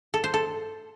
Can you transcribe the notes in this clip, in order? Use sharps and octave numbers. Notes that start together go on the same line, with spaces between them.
A4
C5
A4